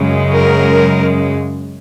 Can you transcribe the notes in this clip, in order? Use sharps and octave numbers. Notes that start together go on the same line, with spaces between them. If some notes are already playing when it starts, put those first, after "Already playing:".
Already playing: F#2 C#3 G#3
A#4